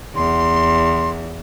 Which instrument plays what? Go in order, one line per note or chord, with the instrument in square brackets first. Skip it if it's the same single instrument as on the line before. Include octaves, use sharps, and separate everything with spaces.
[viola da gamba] E2 [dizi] C6